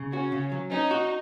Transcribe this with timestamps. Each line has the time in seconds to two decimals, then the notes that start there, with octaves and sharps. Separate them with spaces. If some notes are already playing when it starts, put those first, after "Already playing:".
Already playing: C#3
0.13 C#4 F#4
0.32 C#3
0.52 F#3
0.71 C#4 D#4
0.91 F#4